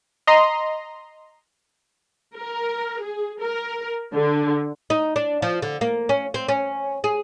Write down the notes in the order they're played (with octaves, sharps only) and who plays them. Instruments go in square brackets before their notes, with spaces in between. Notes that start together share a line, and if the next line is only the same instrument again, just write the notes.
[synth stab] D#5 A#5 C6
[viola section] A#4
G#4
A#4
D3
[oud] D#4
D4
F3
D3
A#3
C#4
C4
C#4
G#4